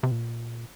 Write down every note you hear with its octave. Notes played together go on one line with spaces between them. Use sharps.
C3
A#2